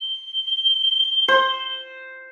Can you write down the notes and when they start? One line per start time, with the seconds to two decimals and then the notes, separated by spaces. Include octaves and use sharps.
0.01 G7
1.28 C5